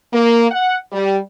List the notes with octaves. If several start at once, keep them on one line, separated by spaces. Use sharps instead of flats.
A#3
F#5
G3